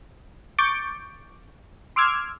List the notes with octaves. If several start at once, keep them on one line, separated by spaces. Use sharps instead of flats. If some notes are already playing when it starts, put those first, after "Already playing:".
C#6 D6 G6 A6 D7
C6 D6 E6 F6 G#6